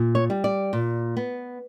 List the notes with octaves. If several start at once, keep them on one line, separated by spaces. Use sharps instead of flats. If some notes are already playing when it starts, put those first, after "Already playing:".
Already playing: A#2
C#5
G3
D5
A#2
B3